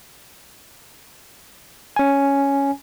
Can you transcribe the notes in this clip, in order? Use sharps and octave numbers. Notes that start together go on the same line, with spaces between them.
C#4 G#5